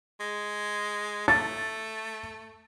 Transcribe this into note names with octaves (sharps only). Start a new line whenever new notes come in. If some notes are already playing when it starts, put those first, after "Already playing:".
G#3
A3 A6